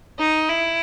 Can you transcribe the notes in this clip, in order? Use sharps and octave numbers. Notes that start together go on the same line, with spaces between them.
D#4
E4